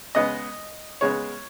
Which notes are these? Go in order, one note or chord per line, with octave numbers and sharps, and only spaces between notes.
C#3 G#3 B3 D#5
C#3 G#3 B3 C#5